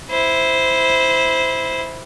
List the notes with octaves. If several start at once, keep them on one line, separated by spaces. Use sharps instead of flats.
E4 C5